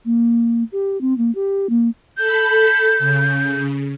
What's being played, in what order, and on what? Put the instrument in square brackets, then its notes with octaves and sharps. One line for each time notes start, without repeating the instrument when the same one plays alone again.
[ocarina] A#3
G4
C4
A#3
G4
A#3
[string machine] A4 B5 [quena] G6
[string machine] C#3